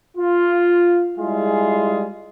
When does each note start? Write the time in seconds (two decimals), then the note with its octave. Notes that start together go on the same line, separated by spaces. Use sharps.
0.17 F4
1.18 G3 G#3 E4 F4 G#4